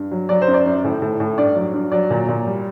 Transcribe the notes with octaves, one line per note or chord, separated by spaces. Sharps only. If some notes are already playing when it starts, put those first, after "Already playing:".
Already playing: G2
F#3
F#3 D5
C5
F#2
D5
F#2
A2
A2
A2
G2 D5
F#3
G2
F#3 D5
A#2
A#2
G3